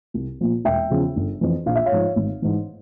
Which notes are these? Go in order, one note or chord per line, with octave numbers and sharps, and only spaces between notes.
C2
A#2 F3
E1 E5 G5
E2 C#3 F3
G1
F2 E3
A#1 F5
E5
C#5 F5
G#2 F3
G#1
G#2 E3